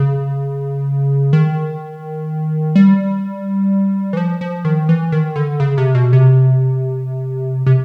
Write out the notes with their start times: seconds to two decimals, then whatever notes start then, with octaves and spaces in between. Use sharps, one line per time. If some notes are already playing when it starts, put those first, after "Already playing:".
Already playing: C#3
1.33 D#3
2.75 G3
4.13 E3
4.17 F3
4.41 F3
4.65 D#3
4.89 E3
5.12 D#3
5.36 D3
5.60 C#3
5.78 C3
5.95 B2
6.13 C3
7.66 C3